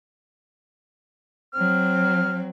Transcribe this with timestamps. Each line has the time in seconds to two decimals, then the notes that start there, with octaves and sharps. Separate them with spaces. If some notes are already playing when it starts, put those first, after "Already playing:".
1.54 F#3 C4 F6